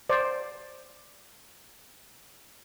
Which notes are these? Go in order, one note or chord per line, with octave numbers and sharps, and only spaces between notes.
C5 D5